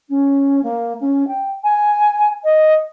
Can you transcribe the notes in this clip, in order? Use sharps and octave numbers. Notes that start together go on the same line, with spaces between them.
C#4
A#3
C#4
G5
G#5
D#5